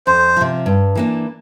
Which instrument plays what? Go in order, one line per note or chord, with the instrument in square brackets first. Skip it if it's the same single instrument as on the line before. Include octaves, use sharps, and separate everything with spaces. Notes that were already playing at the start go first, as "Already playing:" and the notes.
[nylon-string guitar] F2 [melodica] C5
[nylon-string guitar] C3 F3
G2
E3 A#3 D4